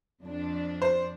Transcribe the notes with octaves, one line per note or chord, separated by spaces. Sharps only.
F2 D4
C5